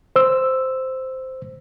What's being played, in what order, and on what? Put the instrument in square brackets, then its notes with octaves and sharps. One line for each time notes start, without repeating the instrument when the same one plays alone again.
[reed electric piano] C5 E6